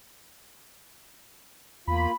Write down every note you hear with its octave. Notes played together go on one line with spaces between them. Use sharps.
E2 A#3 F4 B5